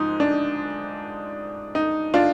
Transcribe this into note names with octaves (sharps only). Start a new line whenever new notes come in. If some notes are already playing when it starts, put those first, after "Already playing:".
Already playing: G#2 F3 G#3 D#4
D4
D#4
D4 F4